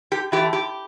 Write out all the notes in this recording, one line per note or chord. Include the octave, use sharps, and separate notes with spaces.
G4
E3 A3 G4
G4